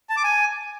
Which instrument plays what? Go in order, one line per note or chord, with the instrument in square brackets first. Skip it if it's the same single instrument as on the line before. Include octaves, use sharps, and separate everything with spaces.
[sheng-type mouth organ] A5
D6
G#5